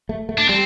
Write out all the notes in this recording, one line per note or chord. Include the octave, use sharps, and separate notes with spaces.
A3
A3
D4
G3 C4